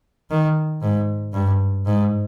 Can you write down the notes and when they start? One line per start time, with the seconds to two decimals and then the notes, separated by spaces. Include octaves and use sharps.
0.30 D#3
0.82 G#2
1.33 G2
1.86 G#2